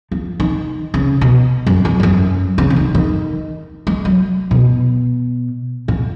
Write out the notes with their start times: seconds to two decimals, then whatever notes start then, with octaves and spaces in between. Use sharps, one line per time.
0.11 F3
0.40 D#3
0.94 C#3
1.21 B2
1.67 F#2
1.85 F2
2.00 F2
2.03 F#2
2.58 C#3
2.70 C#3
2.76 D#3
2.95 D#3
3.87 G#3
4.05 F#3
4.51 B2
5.88 A#2